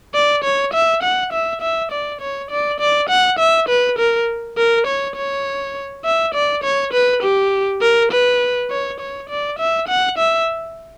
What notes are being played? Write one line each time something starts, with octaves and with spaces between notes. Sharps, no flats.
D5
C#5
E5
F#5
E5
E5
D5
C#5
D5
D5
F#5
E5
B4
A#4
A#4
C#5
C#5
E5
D5
C#5
B4
G4
A#4
B4
C#5
C#5
D5
E5
F#5
E5